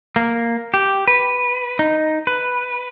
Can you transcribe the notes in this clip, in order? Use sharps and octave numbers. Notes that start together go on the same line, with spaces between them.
A#3
G4
B4
D#4
B4